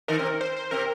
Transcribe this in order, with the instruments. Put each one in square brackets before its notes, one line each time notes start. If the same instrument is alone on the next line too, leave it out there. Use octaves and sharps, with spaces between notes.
[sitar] D#3 D#4 [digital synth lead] A#4
[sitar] C3 C4
[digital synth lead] C5
C5
[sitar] C3 C4 [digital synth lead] A#4